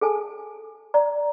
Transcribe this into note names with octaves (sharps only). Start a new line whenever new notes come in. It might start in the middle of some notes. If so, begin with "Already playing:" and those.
G#4 A4 G#5 A5
D5 A#5